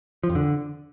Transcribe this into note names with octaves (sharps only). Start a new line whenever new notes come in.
F3
F2
D3